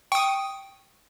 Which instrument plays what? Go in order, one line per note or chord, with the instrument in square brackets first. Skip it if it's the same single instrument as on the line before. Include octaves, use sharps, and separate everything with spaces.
[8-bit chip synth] G5 [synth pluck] C#6 D#6